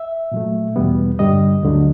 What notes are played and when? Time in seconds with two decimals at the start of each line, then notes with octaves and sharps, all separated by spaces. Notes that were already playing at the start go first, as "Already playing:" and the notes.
Already playing: E5
0.32 A#2 F#3 A3
0.76 E2 B2 G3 B3
1.19 G2 D3 G3 D#5
1.63 D2 D3 F#3